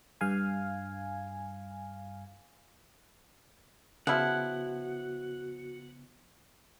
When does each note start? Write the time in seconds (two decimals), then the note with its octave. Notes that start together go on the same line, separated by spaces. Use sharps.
0.21 G2 F5 G#5
4.07 C#3 F3 B3 E4 F#4 F#5